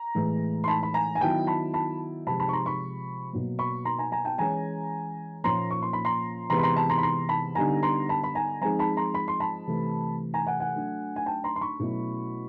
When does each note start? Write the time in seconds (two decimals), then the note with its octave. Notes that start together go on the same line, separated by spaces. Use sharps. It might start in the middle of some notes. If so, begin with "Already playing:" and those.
Already playing: A#5
0.15 A2 E3 G#3
0.64 C6
0.68 A5 B5
0.83 B5
0.94 G#5 A#5
1.15 G#5
1.21 D#3 F#3 B3 E4 G5 A5
1.47 A5 B5
1.74 A5 B5
2.27 C3 F3 G#3 A5 B5
2.40 A5 B5
2.49 C#6
2.53 A#5 C6
2.66 B5 C#6
3.32 B2 F#3 A#3
3.59 B5 C#6
3.85 A#5 C6
3.99 G#5 A#5
4.12 G#5 A#5
4.25 G5 A5
4.38 E3 G#3 C#4 G#5 A#5
5.44 A#2 F3 A#3 C#4 A#5 C6
5.71 C#6
5.82 C6
5.93 B5
6.05 A#5 C6
6.50 C3 E3 G#3 B3 A#5 C6
6.58 B5
6.63 A#5 C6
6.76 A5 B5
6.90 A#5 C6
6.98 B5
7.03 A#5 C6
7.29 A5 B5
7.55 D3 G3 B3 D#4 G#5 A#5
7.83 A#5 C6
8.09 A5 B5
8.24 B5
8.35 G#5 A#5
8.62 F3 G#3 C4 D#4 G#5 A#5
8.79 A5 B5
8.97 A#5 C6
9.14 B5
9.28 C6
9.40 A5 B5
9.68 C3 E3 A3
10.34 G#5 A#5
10.46 F#5 G#5
10.60 F#5 G#5
10.74 F#3 A3 D4
11.16 G#5
11.26 G5 A5
11.44 A#5 C6
11.56 C6
11.61 B5 C#6
11.80 B2 F#3 A3 C#4 E4